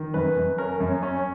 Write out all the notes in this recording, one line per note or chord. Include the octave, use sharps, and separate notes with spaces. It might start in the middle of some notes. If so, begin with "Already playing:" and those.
Already playing: D#3
F#2 B4
F#2
C#4 A#4
F#2
C#5
C#4
C#5